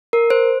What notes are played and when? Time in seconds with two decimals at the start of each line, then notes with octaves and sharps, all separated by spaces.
0.13 A#4
0.30 C5